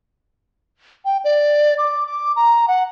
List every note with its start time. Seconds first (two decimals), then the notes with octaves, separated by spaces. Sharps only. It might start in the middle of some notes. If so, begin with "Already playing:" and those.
1.05 G5
1.24 D5
1.78 D6
2.07 D6
2.36 A#5
2.68 F#5